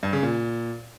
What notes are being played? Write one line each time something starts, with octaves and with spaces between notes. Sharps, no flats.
G2
C#3
A#2